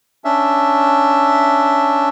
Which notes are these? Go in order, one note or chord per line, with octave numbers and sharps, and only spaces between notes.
C#4 D4 E5